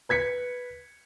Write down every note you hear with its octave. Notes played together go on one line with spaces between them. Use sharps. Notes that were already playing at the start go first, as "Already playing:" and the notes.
B4 G#6 B6 C#7